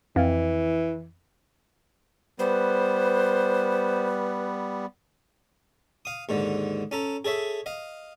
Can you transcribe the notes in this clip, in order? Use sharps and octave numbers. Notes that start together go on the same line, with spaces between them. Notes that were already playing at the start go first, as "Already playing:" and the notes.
F2 E3
G3 B3 B4 C5
F5 D#6
D#2 G#2 D3
C#4 A4 A#5
G#4 A4 C#5 E5
D#5 F5